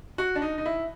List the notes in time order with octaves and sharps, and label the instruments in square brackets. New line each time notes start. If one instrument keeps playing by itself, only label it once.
[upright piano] F#4
D4
D#4
D#4
E4